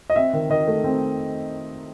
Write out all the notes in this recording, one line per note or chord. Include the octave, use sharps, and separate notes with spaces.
D#5
C4 E5
D#3
D#3 D#5
A3
C4